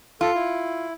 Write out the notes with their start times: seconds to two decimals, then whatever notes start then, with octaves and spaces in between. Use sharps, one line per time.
0.21 F4 A4
0.35 E4